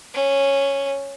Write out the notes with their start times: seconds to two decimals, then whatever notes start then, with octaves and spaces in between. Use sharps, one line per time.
0.14 C#4